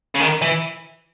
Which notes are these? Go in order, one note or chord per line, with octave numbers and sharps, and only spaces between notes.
C#3
D#3
E3